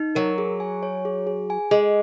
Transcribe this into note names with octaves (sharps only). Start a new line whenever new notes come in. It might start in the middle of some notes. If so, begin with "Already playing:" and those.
Already playing: D#4
F#3 A#4
G#4
G#5
C#5
G#4
G#4
G#5
G#3 G#4